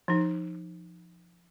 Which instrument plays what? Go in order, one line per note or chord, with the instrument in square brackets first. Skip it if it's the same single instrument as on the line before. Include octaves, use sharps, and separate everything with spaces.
[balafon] F3 D#4